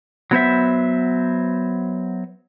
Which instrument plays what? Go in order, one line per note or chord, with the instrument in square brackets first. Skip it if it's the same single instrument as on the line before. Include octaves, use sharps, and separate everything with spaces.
[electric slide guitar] F#3 B3 C5 E5